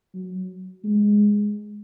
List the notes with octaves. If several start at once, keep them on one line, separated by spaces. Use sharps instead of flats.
F#3
G#3